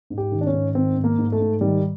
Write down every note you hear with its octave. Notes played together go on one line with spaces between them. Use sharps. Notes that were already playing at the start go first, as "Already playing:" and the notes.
G#2
G4
D#3
D4
C#4
G#2
D#3 C4
G#2
A#3
G#2
A3
G#2
D#3 G3